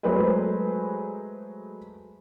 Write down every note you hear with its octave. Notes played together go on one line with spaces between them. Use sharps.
F#3 G#3 A3 G#4 B4 C5